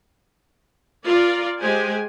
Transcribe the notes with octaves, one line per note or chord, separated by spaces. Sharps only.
F4 A#4 D5
G#3 G4 G#4 C5 G#5